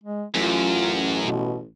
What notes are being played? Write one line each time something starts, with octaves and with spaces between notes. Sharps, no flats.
G#3
A1 F#2 F4
B2